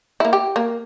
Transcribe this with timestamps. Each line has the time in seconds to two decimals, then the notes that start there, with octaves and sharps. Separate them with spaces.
0.20 A#3 E4
0.33 G4
0.56 A#3